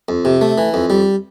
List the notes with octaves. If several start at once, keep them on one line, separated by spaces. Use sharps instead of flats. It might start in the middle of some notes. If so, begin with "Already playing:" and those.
F2
C3
A3
E3
F2
G3